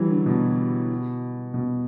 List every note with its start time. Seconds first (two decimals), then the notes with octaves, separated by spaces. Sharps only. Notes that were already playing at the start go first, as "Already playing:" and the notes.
Already playing: E3 F#3 G3
0.10 D3
0.26 B2
1.54 B2